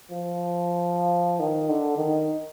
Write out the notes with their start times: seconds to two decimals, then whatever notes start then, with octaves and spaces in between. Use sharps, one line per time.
0.11 F3
1.40 D#3
1.69 D3
1.97 D#3